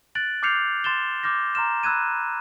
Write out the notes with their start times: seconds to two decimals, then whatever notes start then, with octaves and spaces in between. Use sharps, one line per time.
0.15 F#6 A6 D7 F#7
0.43 D6 F6 G6 C7 C#7 F7
0.84 C6 A6 E7 G7
1.23 D6 F6 G6 A#6
1.55 A#5 C6 F6 E7
1.83 B5 E6 F#6 G#6 D#7